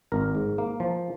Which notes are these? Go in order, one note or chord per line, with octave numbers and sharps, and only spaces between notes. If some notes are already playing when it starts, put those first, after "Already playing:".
G#1 A#4
G#2
A#3
F3